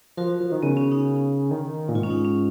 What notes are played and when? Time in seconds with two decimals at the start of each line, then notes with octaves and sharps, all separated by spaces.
0.17 F3 F#4 A#4
0.40 F3
0.52 D#3
0.63 C#3 B3
0.77 C#4
0.92 D#4
1.51 D#3
1.89 A#2
1.95 G#2 F4
2.03 C#4
2.10 D#4
2.25 C#4